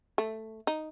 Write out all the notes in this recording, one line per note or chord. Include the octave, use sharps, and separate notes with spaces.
A3
D#4